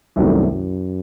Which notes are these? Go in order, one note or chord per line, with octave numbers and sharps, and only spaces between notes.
C2 F#2 C3 D#3 F#3 A3
F#2